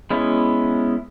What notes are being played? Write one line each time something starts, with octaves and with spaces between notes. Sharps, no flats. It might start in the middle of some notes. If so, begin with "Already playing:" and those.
G#3 B3 C#4 E4